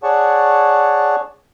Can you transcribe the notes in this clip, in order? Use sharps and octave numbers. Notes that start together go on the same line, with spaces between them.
G#4 C#5 D5 F#5 A5 C#6